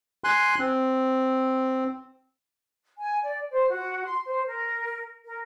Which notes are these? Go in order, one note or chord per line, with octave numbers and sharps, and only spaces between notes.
G#5 C6 F#6
C4
G#5
D5
C5
F#4
C6
C5
A#4
A#4